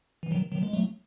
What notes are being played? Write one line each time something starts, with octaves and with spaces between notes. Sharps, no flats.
E3
D#3 F#3
D#3 F#3
G#3
F#3 A3